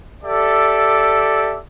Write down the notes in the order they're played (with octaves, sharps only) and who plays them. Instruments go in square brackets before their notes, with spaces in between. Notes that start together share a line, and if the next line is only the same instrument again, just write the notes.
[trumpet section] G4 A4 D5 E5